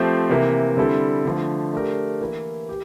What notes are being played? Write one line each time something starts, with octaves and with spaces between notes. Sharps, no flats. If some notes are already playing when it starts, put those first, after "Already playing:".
Already playing: F3 A3 C4 G4 C5
C3 E3 A#3
D3 G3 C4 E4 A4
D3 F3 A3
A3 D4 G4 A#4
E3 A#3 E4
G4